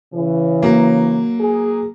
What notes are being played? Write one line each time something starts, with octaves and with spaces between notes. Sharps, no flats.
C#3 E3
F#3 A#3
G#4